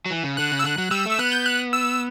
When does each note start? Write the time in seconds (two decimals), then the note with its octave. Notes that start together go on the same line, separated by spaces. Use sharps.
0.06 F#3
0.11 E3
0.24 C#3
0.37 D3 F#6
0.52 C#3
0.59 E6
0.64 D3 F#6
0.78 F#3
0.91 G3 E6
1.06 A3 E6
1.19 B3 F#6
1.32 G6
1.46 F#6
1.73 E6